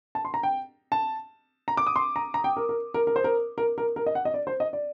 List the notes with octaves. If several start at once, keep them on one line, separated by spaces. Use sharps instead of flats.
A5
C6
A#5
G5
A5
A#5
D6
D#6
C6
A#5
A#5
G5
A#4
A#4
A#4
A#4
C5
A#4
A#4
A#4
A#4
D#5
F#5
D#5
D5
C5
D#5
D5